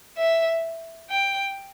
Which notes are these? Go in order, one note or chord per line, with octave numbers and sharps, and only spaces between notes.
E5
G5